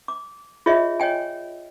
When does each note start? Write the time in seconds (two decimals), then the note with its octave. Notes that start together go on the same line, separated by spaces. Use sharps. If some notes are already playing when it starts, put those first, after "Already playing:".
0.08 D6
0.66 F4 G#4 C#5 D#5 E5
1.00 C#5 D#5 G5 G#5